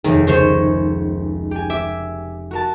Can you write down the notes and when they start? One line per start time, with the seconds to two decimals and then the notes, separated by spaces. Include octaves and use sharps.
0.04 F1 D#2 D#3 G#4
0.27 C#2 D#3 C5 C#5
1.51 G4 G#5
1.70 E5 D6
2.51 F#4 A#4 A5